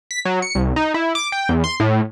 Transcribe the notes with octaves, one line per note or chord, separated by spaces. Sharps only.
B6
F#3
C#7
C2
D#4
E4
D6
G5
E2
C6
A2